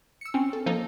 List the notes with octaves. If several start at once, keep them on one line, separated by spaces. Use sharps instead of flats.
E6 C#7
C4 C#4
A4
F3 A#3 D#4 A4